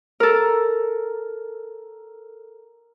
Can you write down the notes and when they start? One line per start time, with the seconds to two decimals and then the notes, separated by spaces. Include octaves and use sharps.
0.20 A4 A#4